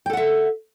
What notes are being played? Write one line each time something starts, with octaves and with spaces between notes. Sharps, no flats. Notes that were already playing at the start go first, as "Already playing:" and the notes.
A4 E5 F#5 G5